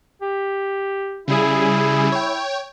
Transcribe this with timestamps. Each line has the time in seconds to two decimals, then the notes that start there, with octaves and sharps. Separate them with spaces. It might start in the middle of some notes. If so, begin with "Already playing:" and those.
0.22 G4
1.28 C#3 G3 E4 G#4
2.12 C#5 G5